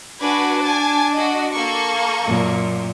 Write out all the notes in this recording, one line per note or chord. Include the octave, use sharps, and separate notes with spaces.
D4 F#4 B4 G#5
G#5 A5
F#4 D#5
A#3 A4 C#6
F#2 A#2